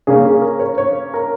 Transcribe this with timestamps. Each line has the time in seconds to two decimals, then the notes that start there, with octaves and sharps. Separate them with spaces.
0.07 C#3 A#3 C#4 G#4
0.25 G#4
0.42 A#4
0.60 C#5
0.78 C#5
1.14 A#4